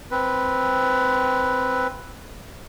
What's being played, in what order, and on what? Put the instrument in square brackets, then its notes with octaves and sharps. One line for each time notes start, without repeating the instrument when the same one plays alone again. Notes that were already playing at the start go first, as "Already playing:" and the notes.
[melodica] C4 B4